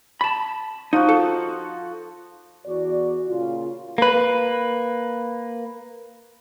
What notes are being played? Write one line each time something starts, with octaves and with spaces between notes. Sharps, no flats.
A5 B5
F3 D#4 F#4
A4
E2 F#4 D5
A#2 C#3 F4
A#3 B4